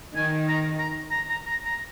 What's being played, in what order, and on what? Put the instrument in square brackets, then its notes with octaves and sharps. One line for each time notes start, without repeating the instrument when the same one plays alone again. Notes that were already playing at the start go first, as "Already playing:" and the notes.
[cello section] D#3 [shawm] G#5
[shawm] A#5
A#5
A#5
A#5
A#5
A#5